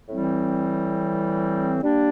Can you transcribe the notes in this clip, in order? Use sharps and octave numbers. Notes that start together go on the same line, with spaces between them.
A2 E3 G3 C4 E4
G3 A#3 D4 G4